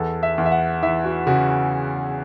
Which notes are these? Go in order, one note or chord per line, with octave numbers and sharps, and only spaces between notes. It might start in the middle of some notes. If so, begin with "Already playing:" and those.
Already playing: E2 A4
E5
E2
E5
F#5
E3 E5
F#4
C#3 F#4